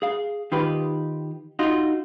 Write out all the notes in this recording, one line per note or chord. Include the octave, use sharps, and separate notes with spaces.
G#4 F5
D#3 F4 G4 B4
D#4 F4 F#4